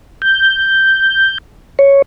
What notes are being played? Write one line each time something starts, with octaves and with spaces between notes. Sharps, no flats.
G6
C#5